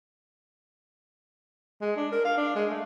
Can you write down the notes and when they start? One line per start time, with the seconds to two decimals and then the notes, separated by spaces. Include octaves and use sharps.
1.81 G#3
1.97 D4
2.12 A#4
2.25 F5
2.38 D4
2.56 G#3
2.69 A3